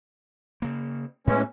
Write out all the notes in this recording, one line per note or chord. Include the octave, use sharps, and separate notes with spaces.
C#3 A#3
A2 E3 G#3 A3 B3 C#4